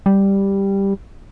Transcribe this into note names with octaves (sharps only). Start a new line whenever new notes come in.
G3